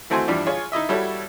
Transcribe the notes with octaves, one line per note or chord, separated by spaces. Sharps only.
E3 A3 C4 F#4 G#5 C6
E2 G2 F3 G3 D4
F4 G#4 C#5
D#4 E4 D#5 E5
G3 E4 F#4 A4 C#5